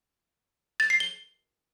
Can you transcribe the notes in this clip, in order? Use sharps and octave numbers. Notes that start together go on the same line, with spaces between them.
A6
C7
G7